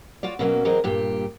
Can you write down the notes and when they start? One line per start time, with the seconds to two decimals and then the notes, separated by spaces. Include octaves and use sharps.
0.23 F4 F#4 C#5 D5
0.39 B2 F#3 A#3 B3 C#4 F#4
0.65 E3 F#3 G#3 C4 A#4 D#5
0.84 G2 A#2 G4